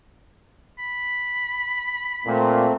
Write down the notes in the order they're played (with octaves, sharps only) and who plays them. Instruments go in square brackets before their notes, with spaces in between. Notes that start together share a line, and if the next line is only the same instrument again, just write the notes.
[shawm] B5
[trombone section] A#2 [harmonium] A3 C4